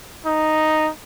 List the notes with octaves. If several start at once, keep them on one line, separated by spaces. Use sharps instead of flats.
D#4